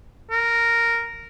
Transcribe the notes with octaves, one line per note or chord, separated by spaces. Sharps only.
A#4